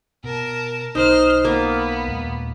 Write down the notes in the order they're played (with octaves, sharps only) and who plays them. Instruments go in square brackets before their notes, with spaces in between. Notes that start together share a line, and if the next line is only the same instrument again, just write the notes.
[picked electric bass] B2 [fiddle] A#4 A5
[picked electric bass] B1 [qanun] D#4 [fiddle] C5 F6
[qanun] A#3 [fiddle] B3
[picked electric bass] D#2 A#2 G#3